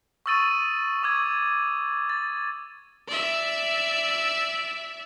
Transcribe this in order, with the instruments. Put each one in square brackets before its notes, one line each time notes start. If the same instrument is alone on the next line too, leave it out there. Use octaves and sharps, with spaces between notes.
[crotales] C#6 D#6 E6 A6 D#7 F#7
C#6 D6 E6 G#6
A6
[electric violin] D5 E5